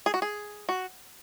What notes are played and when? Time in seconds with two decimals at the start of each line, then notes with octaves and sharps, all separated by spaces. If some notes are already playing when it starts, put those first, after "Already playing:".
0.06 G#4
0.14 F#4
0.22 G#4
0.69 F#4